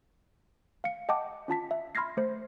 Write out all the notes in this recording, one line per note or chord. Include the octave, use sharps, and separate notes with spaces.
F5 C#7
D#5 F#5 G5 A5 D6
C#4 F4 A5 B6
E5
B5 C6 F6 G#6 A#6 C7
A3 C5